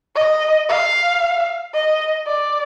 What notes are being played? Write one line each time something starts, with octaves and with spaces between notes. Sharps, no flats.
D#5
F5
D#5
D5